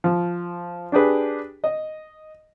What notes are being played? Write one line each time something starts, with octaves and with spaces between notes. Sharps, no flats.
F3
D4 G4 G#4 B4
D#5